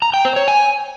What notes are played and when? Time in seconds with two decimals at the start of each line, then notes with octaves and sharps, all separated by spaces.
0.02 A#5
0.14 G5
0.25 C5
0.36 C#5
0.48 G#5